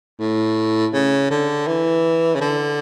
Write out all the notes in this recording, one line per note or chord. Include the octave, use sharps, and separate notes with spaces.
A2
C#3
D3
E3
C#3
D3